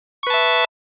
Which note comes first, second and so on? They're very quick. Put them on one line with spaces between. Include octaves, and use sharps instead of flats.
C#6 B4 A5 E5